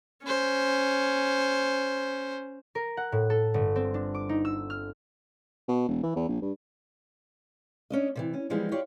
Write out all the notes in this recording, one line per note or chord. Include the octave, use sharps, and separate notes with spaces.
C#4 C5
A#4
F#5
A2
A4
G1
C4
D4
D6
D#4
E6
F6
B2
E1
E3
E2
A#1
G2
C#4 D4 D#5
C3 D#3 E3
C#4
E3 F3 G3 G#3 B3 D#4
F4 G4 C#5 D5